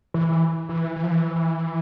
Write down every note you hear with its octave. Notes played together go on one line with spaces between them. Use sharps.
E3
E3
E3
F3
E3
E3